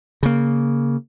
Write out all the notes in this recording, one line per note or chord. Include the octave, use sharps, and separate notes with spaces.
C#3 A#3